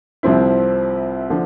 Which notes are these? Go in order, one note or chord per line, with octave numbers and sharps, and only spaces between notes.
C2 C3 F3 C4 E4
D3 F3